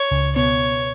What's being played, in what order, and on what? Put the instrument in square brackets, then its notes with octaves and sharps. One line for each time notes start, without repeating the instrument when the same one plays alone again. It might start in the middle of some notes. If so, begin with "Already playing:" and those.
Already playing: [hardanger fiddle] C#5
[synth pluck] C#2 C#3
[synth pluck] B2 B3 [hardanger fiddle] C#5